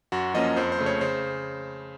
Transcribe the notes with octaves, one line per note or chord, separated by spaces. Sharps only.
F#2 F#4
F3 A#3 C#4 D#5
F2 C5
C5
C#3 A3
C#5
C#3 C5